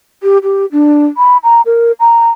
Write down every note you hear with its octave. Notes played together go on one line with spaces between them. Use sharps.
G4
G4
D4
B5
A#5
A#4
A#5